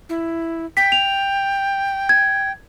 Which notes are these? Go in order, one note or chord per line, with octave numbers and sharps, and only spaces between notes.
E4
G5 B6
F7
G#6